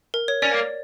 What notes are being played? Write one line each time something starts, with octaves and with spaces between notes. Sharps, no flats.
A#4
C#5
C#4 D5
A#3